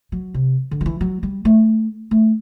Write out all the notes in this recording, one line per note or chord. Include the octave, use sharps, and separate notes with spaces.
F#3
C3
D3
F#3
E3
F#3
G3
A3
A3